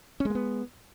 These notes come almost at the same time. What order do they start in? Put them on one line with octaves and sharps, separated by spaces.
C#4 G#3 A#3 B3